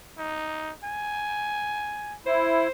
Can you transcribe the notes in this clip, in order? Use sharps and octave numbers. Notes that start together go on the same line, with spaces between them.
D#4
G#5
E4 C5